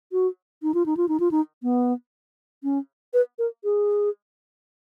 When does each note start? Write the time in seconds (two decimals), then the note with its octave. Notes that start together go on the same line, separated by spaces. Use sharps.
0.12 F#4
0.63 D#4
0.74 F4
0.86 D#4
0.97 F4
1.09 D#4
1.20 F4
1.31 D#4
1.63 B3
2.63 C#4
3.14 B4
3.39 A#4
3.64 G#4